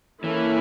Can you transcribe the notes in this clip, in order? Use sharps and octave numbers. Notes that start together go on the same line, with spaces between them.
E3 A#3 C#4 E4 A4